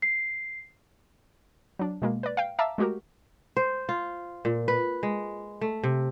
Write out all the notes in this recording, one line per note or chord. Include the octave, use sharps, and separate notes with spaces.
C7
F#3 D4
B2 G#3 A#3
B4 D5
F5 G5
E5 F5 A5 A#5 D6 E6
G#3 A3 F#4 G4 A#4
C5
F4
A#2
B4
G#3
A3
C3